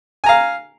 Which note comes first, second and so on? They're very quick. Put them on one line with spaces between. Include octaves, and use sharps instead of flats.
G#5 A#5 F5